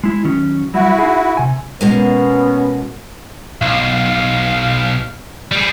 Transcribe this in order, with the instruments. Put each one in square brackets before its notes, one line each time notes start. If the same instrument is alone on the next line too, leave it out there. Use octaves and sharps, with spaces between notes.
[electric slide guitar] G#3 E4
D#3 F#3 C#4
[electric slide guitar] F#3 G3 [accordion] E4 F#4
[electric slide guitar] D#4 G#4
C3 G#5
[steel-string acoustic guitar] B2 G#3 A#3 [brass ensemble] B3 C#4
[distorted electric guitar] B1 [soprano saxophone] F5
[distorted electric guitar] G3 G#4